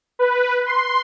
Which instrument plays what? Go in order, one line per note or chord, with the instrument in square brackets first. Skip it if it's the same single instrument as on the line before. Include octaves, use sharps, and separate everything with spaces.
[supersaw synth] B4
C6